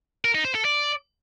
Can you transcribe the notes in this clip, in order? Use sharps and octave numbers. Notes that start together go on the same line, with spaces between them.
A#4
D#4
C5
A4
D5